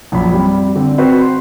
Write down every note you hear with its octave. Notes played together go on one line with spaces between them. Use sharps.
A#1 F#2 F4 B5
G3 C4
D3 C4
C4 F#4 B4 C5
C6